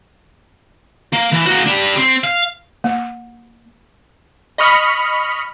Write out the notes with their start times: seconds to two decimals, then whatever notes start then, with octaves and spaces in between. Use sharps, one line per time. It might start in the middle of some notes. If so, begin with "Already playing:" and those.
1.13 A#3
1.32 E3
1.46 A#3 F#4
1.66 G3 D4
1.97 C4
2.24 F5
2.84 A#3
4.58 D#5 B5 C#6 F6